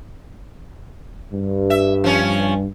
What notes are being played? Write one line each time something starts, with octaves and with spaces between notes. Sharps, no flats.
G2
E5
F3 C#4